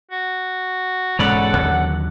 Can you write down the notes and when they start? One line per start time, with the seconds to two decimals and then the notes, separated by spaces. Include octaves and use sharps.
0.11 F#4
1.19 E1 G#2 G#3 C#4 A4 D5 F#5 B5
1.57 D#2 D3 F#3